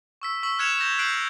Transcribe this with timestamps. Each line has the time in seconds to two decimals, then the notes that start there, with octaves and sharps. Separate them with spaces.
0.22 C#6 E6 B6
0.43 C#6 E6 B6 F#7
0.59 F6 F#6 G#6 C#7 E7 F7
0.80 G6 A#6
0.98 F#6 G6 C7 D7 F#7